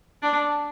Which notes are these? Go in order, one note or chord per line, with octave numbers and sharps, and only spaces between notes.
D4